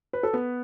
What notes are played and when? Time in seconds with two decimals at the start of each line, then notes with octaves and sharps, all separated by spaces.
0.13 B4
0.23 A4
0.33 B3 B4